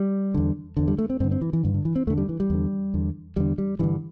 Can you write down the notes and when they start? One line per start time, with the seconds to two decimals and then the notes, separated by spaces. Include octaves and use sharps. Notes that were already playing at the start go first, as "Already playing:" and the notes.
Already playing: G3
0.34 E2 D3
0.77 E2 D3
0.88 G3
0.98 A3
1.10 C4
1.20 G2 C4
1.24 D3
1.31 C4
1.41 E3
1.53 E3
1.63 G2 D3
1.74 D3
1.85 E3
1.96 C4
2.07 E2 A3
2.10 D3
2.18 G3
2.29 E3
2.40 G3
2.50 E2 D3
2.94 E2 D3
3.36 E2 D3 G3
3.58 G3
3.79 G2 D3 E3